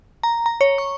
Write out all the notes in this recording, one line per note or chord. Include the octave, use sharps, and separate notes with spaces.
A#5
A#5
C#5
C#6